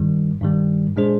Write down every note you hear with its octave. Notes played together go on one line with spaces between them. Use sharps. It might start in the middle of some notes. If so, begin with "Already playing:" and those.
Already playing: G2 D#3 G3
G2 D#3 G3
A#2 G#3 D4 G#4 C5